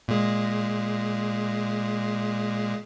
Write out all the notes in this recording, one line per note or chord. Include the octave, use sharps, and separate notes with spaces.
A#2 G#3